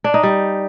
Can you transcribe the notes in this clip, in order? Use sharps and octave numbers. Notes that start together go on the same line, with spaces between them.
D4
D#4
G3